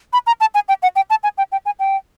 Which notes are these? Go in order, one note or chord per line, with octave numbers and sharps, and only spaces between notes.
B5
A#5
A5
G#5
G5
F#5
G5
A5
G#5
G5
G5
G#5
G5